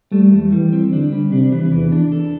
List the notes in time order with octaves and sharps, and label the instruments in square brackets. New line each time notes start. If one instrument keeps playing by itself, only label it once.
[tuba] G3 [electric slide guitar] A3
[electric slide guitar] E2
[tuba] E3 [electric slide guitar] G3
[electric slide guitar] C4
[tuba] D3 [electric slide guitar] D4
[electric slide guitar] G3
[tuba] C3 [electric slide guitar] D4
[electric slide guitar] E3
[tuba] E2 [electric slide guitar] E3
[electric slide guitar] D4
A4